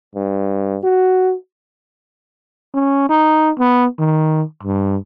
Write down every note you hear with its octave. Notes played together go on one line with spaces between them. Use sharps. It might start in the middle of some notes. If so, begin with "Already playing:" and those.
G2
F#4
C#4
D#4
B3
D#3
G2